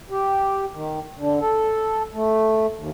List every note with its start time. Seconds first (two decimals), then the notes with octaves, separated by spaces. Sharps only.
0.10 G4
0.73 D#3
1.16 D3
1.40 A4
2.14 A3
2.76 D#2